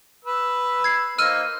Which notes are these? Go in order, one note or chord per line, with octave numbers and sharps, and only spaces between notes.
B4 E6
G#6 C7
A#3 D#4 C5 E6 F6 D#7